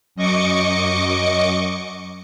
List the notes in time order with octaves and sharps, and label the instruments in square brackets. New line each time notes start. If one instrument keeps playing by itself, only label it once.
[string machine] F#2 D#5 C#6 D6 C#7